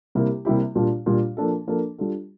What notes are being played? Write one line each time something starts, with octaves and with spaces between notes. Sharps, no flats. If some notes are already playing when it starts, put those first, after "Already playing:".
C3 G3 A#3 E4 G4
C3 G3 A#3 E4 G4
A#2 G3 D4 F4
A#2 G3 D4 F4
F3 A#3 D4 A4
F3 A#3 D4 A4
G3 D4 F4 A4